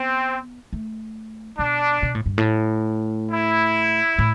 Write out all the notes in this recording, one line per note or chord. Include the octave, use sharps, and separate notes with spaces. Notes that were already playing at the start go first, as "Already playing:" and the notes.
Already playing: B3 C4
A3
B2 D4
B2
A2
G2
A2
E4
A2